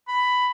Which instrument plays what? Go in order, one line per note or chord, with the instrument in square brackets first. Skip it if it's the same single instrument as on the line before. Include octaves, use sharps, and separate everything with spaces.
[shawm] B5